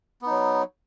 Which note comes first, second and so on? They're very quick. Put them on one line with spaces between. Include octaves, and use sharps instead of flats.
B3 D#4 F#3